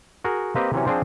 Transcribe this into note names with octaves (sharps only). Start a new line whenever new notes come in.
F#4 G#4 A#4
A#3 C4 G4 B4 D#5
C3 E3 F#3 C#4
F3 C4 D4 G#4 C5